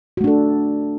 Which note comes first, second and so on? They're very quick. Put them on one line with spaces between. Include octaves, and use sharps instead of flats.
F#4 A3 D4 A4